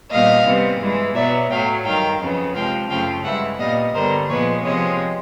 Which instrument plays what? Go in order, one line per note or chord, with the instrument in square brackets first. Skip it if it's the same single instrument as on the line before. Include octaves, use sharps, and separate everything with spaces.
[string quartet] A#2 G3 B3 D#5 F5
C3 E3 G3 B3
G2 E3 G#3
B2 F#3 B3 D5 E5
A2 F#3 A3 F5 G5
G2 D#3 F#3 F5 G5
F2 C#3 F#3 B3
C3 F3 G#3 F5 G5
F#2 C#3 F3 A3 F5 G5
G2 E3 G#3 E5 F#5
A#2 G3 B3 D#5 F5
G2 D3 G3 B3 A#4 C5
A#2 F3 G#3 B3 B4 C#5
C3 F3 G#3 B3 C#5 D#5